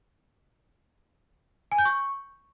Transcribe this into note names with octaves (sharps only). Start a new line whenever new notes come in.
G#5
G6
C#6